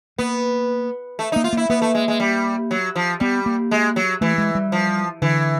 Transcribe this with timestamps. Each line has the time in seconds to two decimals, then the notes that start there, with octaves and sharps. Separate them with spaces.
0.18 A#3 B3
1.19 A3
1.32 D#4
1.36 A#3
1.44 F4
1.53 A#3 E4
1.70 A#3 B3
1.82 A3
1.95 G#3
2.08 G#3
2.20 G3
2.71 F#3
2.96 F3
3.20 G3 B3
3.46 A#3
3.71 G#3
3.96 F#3
4.21 E3 A3
4.38 G#3
4.55 G3
4.72 F3
5.22 D3 E3